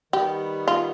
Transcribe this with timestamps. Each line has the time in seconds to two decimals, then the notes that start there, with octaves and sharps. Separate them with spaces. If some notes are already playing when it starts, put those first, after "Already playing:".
0.13 D#3 G3 B3 G4
0.68 F4